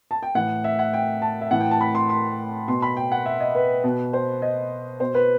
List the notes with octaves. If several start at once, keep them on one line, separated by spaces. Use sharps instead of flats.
A5
G5
A2 E3 F#5
E5
F#5
G5
A5
E5
A2 E3 F#5
G5
A5
B5
C6
C6
B2 C6
B5
G5
F#5
E5
D#5
B4
B2
C5
D#5
B2 C5
B4